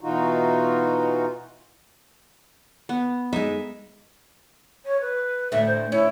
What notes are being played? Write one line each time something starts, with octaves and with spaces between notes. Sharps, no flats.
B2 E3 D#4 F4 F#4
B3
G#3 D#4 E5
C#5
B4
D2 A2 A3 E5
C5
C#4 E4